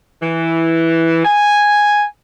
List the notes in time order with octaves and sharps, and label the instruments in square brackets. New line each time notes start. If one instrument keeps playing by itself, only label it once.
[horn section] E3
G#5